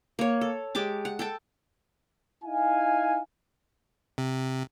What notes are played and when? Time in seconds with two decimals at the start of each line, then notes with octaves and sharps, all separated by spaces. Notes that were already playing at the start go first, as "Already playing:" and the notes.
0.19 A#3 C#5
0.41 A4
0.75 G#3 G4 A5 D6
1.05 F#5
1.19 A4 G5 A5
2.44 D#4 E4 F5 G#5
4.18 C3